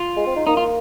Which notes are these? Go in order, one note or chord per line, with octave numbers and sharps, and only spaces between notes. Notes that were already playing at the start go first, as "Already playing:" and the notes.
Already playing: F4
G#3
C4
D#4
A#3 D#4
F4